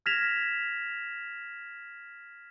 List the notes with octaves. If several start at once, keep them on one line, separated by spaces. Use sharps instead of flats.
F6 G#6 A#6 B6 E7 F7